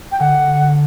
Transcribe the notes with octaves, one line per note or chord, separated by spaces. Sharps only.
G5
D3 F#5